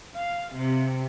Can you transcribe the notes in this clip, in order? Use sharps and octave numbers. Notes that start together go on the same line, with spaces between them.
F5
C3